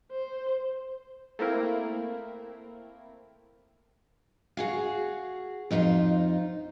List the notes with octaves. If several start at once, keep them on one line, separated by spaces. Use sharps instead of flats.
C5
A3 A#3 C4 E4 A#4
F#4 G#4 F5
F2 D#4 F4 G#4 C5